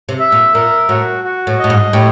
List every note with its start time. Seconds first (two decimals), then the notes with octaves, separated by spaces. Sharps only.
0.09 C3
0.20 E5
0.32 A#2
0.55 A#2 A#4
0.89 A2 F#4
1.24 F#4
1.47 A2
1.59 A2 D#5
1.70 G#2
1.93 A2 G4